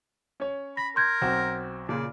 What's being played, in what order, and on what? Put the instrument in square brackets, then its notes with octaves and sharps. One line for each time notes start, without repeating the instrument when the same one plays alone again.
[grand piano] C#4 C#5
[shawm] B5 [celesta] A#6
[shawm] A#4 [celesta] C6 G6 G#6
[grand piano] B1 C4 F#4
[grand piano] A#2 C#3 [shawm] D5